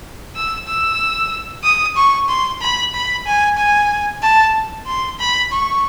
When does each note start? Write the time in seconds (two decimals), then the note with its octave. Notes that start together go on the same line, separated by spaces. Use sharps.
0.36 E6
0.67 E6
1.64 D#6
1.96 C#6
2.28 C6
2.61 B5
2.94 B5
3.26 G#5
3.58 G#5
4.22 A5
4.86 C6
5.19 B5
5.52 C#6